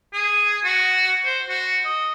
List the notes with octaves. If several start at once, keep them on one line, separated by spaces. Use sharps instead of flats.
G#4
F#4
C5
F#4
D#5